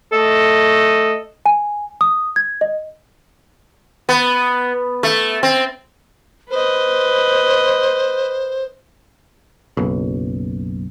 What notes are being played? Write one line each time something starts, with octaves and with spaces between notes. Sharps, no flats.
A3 A4 D#5
G#5
D#6
G#6
D#5
B3
A3
C4
B4 C5 D#5
F#1 B1